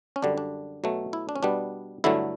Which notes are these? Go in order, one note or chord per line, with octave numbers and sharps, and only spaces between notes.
C#4
F#2 D3 G3 D4
D4
B2 F#3 A3
E4
D4
C#4
B2 G3 B3 D4
G2 D3 F#3 A3 E4